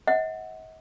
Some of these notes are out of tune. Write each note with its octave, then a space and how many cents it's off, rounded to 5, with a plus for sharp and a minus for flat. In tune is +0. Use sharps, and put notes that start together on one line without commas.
D#5 +45 F#5 +0